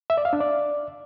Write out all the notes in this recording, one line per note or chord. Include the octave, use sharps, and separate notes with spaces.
E5
D5
F5
D4
D5